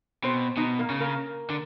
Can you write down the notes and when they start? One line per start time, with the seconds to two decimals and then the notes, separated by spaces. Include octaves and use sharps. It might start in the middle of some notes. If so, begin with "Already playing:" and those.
0.24 B2 C4 C5
0.57 B2 D#4 D#5
0.79 A#3 A#4
0.90 C#3
1.00 A#3 A#4
1.50 D3